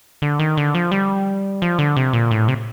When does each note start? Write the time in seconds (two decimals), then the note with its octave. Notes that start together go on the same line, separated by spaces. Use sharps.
0.22 D3
0.39 D#3
0.57 D3
0.75 F3
0.91 G3
1.62 F3
1.79 D3
1.97 C3
2.13 A#2
2.31 A2
2.48 C3